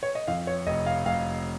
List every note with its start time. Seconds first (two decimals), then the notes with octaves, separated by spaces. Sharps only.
0.03 C#5
0.15 D#5
0.28 F2 F5
0.47 C#5
0.67 F1 D#5
0.86 F5
1.05 F1 F5